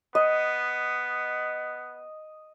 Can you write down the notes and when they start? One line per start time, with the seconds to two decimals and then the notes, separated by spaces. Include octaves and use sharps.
0.15 B3 D#5